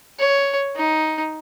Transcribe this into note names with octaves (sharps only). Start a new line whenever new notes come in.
C#5
D#4